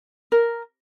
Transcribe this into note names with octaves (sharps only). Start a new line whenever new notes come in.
A#4